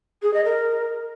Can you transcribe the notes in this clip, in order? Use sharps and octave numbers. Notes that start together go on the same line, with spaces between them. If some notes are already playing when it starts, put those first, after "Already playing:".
G#4
D#5
A#4